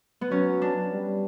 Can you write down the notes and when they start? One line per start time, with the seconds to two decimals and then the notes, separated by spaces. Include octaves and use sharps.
0.21 B3
0.31 F#3 C#4
0.62 D4
0.92 G3